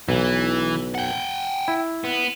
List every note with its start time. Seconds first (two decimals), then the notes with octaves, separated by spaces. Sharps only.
0.09 B1 E3
0.95 F#5 G5
1.68 E4
2.04 B3